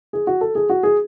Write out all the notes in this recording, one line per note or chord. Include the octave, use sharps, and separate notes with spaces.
G#4
F#4
A4
G#4
F#4
G#4